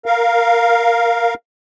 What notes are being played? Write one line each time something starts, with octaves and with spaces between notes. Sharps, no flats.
A#4 F5